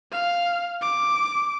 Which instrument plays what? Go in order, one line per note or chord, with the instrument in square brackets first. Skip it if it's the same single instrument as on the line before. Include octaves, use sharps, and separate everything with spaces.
[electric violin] F5
D6